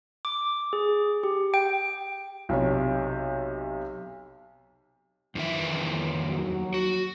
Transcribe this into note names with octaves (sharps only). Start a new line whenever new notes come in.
D6
G#4
G4
G5
B1 C3 C#5
F2 D#3 E3 E5
D#2 F#3
F#4